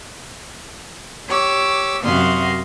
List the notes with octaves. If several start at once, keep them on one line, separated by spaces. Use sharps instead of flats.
G4 C#5 D6 E6
F#2 C3 F#4 F5 C6 D#6